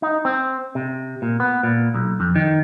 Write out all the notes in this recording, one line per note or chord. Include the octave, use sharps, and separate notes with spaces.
D#4
C4
C3
A#2
B3
A#2
B1
F2
D#3